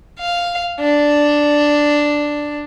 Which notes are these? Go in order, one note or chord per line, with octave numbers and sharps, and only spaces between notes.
F5
D4